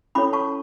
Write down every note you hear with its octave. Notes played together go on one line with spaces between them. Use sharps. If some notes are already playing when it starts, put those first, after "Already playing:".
C#4 E4 A4 C#5 B5 D6
A5 C#6